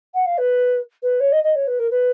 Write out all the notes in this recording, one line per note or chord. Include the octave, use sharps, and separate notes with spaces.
F#5
F5
B4
B4
C#5
D#5
D#5
C#5
B4
A#4
B4